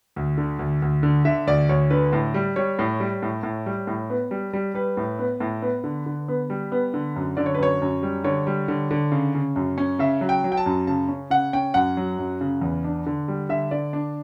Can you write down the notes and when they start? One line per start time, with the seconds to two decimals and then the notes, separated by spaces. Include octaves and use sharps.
0.16 D2
0.38 D3
0.59 D2
0.82 D2
1.03 D3
1.25 D3 E5
1.47 D2 D5
1.69 D2 C#5
1.90 D3 B4
2.13 A2
2.34 G3
2.56 G3 C#5
2.79 A2
3.00 G3
3.22 A2
3.43 A2
3.66 G3
3.87 A2
4.10 B3
4.31 G3
4.53 G3
4.74 G3 B4
4.97 A2
5.19 B3
5.40 A2
5.62 B3
5.84 D3
6.06 D3
6.28 B3
6.50 G3
6.72 B3
6.94 D3
7.16 F#2
7.37 D3 D5
7.46 C#5
7.54 B4
7.59 F#2 C#5
7.82 F#2
8.03 G3
8.24 D3 C#5
8.47 G3
8.68 D3
8.91 D3
9.12 C#3
9.35 C#3
9.56 F#2
9.78 C#4
9.99 C#3 E5
10.21 F#3
10.29 G5
10.44 F#3
10.52 G5
10.57 A5
10.66 F#2
10.87 C#3 A5
11.08 C#4
11.30 C#3 F#5
11.53 C#4 G5
11.74 F#2 F#5
11.97 F#3
12.19 F#2
12.41 C#3
12.61 E2
12.84 D4
13.06 D3
13.28 G3
13.49 D3 E5
13.71 D3 D5
13.93 D4